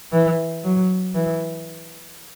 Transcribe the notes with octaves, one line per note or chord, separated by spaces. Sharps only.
E3
F#3
E3